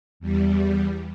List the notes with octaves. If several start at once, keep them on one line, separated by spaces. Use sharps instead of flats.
E2 G3